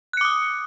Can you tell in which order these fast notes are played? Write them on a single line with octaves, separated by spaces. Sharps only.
F#6 C#7 D6 D#6